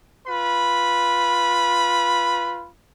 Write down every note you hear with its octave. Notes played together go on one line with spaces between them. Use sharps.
F4 B4 B5